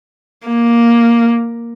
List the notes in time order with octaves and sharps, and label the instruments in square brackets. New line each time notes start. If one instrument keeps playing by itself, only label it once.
[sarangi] A#3